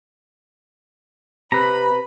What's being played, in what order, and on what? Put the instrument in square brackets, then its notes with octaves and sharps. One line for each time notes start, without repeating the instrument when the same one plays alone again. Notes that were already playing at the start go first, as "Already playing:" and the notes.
[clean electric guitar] C3 [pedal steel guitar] B4 A#5 [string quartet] B5